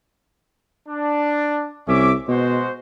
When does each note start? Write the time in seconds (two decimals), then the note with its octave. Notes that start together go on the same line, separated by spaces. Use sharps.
0.89 D4
1.88 C2 C#4 E5 D6
2.28 B2 G#3 F#4 C5